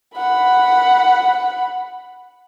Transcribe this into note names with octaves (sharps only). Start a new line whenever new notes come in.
F#5 B5